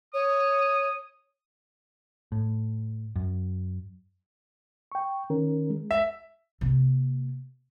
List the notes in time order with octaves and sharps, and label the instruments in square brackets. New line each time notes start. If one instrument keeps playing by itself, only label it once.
[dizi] C#5 [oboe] D#6
[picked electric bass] A2
F#2
[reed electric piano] G5 C#6
D#3 C#4 A#4
G#3
[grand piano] E5
[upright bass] C3 A#3